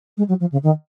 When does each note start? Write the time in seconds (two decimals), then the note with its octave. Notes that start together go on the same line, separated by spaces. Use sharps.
0.17 G#3
0.28 F#3
0.40 F3
0.52 C#3
0.63 D#3